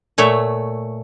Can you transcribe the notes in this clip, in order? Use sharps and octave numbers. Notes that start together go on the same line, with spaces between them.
A#2 A3 C#5 E5